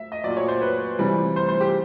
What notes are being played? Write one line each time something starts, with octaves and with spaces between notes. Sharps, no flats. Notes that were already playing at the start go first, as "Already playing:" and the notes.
Already playing: E5
D#5
A#2 F#3 D5
C#5
C5
B4
C3 E3 G3
C5
C5
G4